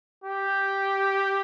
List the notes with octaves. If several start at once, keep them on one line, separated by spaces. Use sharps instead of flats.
G4